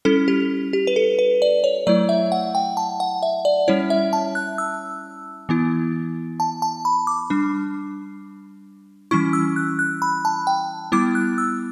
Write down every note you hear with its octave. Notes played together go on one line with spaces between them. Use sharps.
G3 C#4 E4 A4
G4
G4
B4
A4
B4
D5
C#5
F#3 A3 E4 D5
E5
F#5
G5
A5
F#5
E5
D5
G3 C#4 E4 C#5
E5
A5
F#6
E6
E3 B3 E4
A5
A5
B5
D6
G3 D4
E3 G3 C#4 E4 C#6
E6
F#6
F#6
B5
A5
G5
G3 B3 E4 D6
F#6
E6